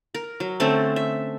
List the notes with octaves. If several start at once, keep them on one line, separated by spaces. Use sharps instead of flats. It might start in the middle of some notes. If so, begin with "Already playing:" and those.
A#4
F#3
D3 A3 C4 C#4
E5